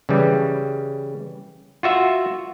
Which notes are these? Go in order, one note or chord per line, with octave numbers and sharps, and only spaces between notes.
C#3 E3 G3
F4 F#4 E5